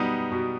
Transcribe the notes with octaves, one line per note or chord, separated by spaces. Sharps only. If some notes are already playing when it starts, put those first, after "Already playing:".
Already playing: B2 G3 B3 D#4
B2